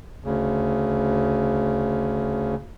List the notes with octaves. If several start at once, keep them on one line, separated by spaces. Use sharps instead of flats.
D2 C#3